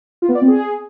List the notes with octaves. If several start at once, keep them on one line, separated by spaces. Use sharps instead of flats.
F4
B3
D5
C4
G#4